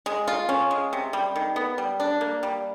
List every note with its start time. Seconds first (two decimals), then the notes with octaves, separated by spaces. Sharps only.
0.06 G#3
0.28 F4
0.49 C#4
0.71 G#3
0.93 C3
1.13 G3
1.36 D#3
1.56 B3
1.78 G3
2.00 D4
2.21 A#3
2.43 G3